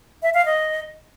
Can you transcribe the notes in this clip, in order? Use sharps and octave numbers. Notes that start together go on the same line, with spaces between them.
E5
F5
D#5